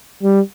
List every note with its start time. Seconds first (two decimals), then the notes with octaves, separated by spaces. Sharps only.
0.23 G3